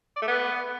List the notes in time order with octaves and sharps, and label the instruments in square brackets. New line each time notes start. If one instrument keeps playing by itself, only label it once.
[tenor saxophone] D5
A3
B3